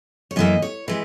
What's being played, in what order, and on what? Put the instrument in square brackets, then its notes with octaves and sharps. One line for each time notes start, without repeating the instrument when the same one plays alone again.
[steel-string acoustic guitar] C#5
F#2 E3 A#3 D#5
C#5
E3 G#3 B4